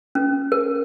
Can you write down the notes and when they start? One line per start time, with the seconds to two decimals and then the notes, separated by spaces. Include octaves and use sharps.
0.15 C#4
0.52 A#4